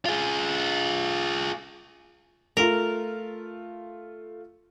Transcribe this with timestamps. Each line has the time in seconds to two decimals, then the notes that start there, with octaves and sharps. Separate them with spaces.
0.06 F4 G#4
2.57 A3 F4 A#4